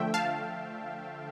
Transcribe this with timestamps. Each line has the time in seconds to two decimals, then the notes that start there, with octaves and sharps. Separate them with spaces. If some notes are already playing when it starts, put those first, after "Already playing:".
Already playing: D3 F3 A3 E5 G5
0.14 F5 A5